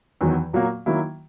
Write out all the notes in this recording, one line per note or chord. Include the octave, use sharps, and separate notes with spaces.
E2 D#3 F#3 B3
A#2 F#3 A#3
D#3 F#3 A#3 E4